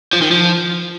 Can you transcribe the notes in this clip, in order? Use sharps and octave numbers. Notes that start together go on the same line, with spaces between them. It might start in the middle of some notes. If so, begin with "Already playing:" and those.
F3
D#3
F3